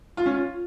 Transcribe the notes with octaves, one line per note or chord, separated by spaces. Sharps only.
F4
C#4
F4